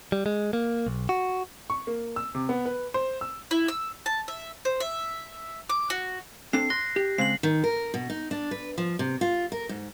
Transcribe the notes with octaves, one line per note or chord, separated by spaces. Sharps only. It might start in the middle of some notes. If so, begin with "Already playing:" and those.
G3
G#3
A#3
B1
F#4
C#6
A#3
E6
C3
B3
B4
C5
E6
E4
E6
A5
E5
C5
E5
D6
F#4
C4 D4 A4 C7
C6 F#6 A#6
G4
C#3 G#3 C4 C7 F#7
D#3
A#4
B2
D#4
D4
B4
F3
C3
F4
A#4
G#2